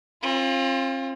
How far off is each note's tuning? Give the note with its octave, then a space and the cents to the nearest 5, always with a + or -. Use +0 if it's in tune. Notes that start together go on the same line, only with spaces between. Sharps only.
C4 +40 F4 +0